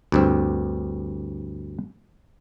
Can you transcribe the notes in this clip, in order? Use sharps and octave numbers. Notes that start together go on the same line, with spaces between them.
D2 G2 C4